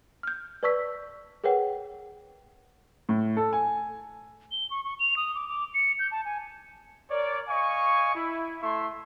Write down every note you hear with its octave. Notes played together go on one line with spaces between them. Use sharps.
F6 G6
B4 D5 A5 C#6 E6 B6
G#4 A#4 B4 C#5 F#5 G5
A2
A4
G#5
G7
C#6
C#6
F7
D#6
D6
D6
C#7
G6
A5
G#5
A#4 C#5 D5
D#5 F5 G#5 C#6
E4
A3 E4 E5 C6 C#6